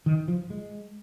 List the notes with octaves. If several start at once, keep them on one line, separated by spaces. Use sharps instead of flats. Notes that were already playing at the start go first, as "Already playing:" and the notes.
D#3
F3
G#3